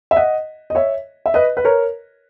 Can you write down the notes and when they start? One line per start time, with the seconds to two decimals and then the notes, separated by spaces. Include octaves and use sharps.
0.11 E5
0.16 D#5 F#5
0.70 D#5
0.75 C#5 E5
1.26 E5
1.34 B4 D#5
1.57 B4
1.65 A#4 C#5